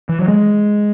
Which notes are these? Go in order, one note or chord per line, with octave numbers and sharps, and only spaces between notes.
E3
F#3
G#3